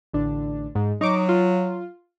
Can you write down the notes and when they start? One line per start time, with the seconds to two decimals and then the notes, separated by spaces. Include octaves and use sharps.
0.13 A1 D3 D4
0.75 G#2
1.01 F#3 D#4 C#6 D6
1.29 F4